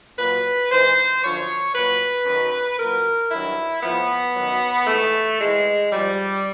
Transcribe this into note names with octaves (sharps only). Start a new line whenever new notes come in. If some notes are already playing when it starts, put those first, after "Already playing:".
A#2 F#3 B4
G#2 E3 C5
F#2 D3 F3 C#5
A#2 F#3 B4
F#2 D#3 F#3
A#2 F#3 A#4
G2 D#3 F#3 E4
A2 F3 B3
F#2 D#3 F#3
G#2 E3 A3
A2 E3 G#3
G#2 F3 G3